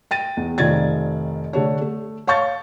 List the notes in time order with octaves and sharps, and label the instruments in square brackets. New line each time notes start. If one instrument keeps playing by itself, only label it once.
[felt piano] G5 A6 D#7
E2
F1 D#3 F3 D5 G#6 A6
D3 A3 D4 C#5
A3
C#5 F5 A5 C#6 G6 A6